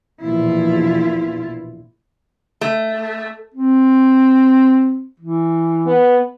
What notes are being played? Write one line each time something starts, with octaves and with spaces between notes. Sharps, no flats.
A#1 E2 B2 E4 F4
A3
C4
E3
B3